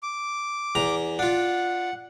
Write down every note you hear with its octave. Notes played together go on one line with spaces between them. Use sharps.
D6
E2 A#5
D4 F4 F#5